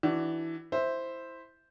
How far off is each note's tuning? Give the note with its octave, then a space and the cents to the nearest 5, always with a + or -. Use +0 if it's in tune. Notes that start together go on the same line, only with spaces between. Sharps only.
E3 +0 D4 +0 F#4 +25
E4 +0 C5 +0 E5 -5